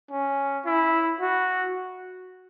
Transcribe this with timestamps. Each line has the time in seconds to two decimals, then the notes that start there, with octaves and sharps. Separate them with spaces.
0.11 C#4
0.66 E4
1.20 F#4